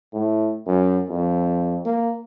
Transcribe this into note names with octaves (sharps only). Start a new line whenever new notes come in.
A2
F#2
F2
A#3